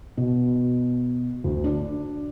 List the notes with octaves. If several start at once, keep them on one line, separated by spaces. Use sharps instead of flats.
B2
D2
D4